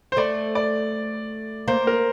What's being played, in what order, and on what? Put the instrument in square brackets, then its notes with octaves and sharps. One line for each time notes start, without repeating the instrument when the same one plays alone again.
[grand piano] C5
[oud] A3 [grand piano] D5
[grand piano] D5
[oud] A#3 [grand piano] C5
[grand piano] A#4